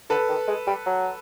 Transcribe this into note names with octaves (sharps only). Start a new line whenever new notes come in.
D3 A4 B4
D#3
G#3
G3
F#3